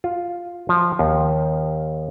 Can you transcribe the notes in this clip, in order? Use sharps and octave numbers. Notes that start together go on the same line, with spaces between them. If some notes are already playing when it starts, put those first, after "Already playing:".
F4
F3
D#2